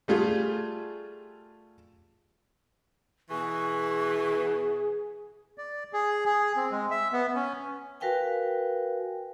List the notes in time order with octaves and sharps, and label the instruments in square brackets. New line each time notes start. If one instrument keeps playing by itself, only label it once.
[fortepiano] G3 A3 F4 G#4
[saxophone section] B2 E3 [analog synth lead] G#4 [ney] C#6
[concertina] D5
G#4
G#4
C4
G#3
E5
B3
C#4
[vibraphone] F#4 A#4 B4 F5 G5 G#5